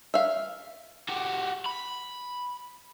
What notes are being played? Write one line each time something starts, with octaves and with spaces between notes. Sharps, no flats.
E5 F5
F#4 G4
B5